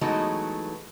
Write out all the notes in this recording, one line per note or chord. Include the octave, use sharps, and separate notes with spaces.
E3 F#3 G#3 A3 B3 D#4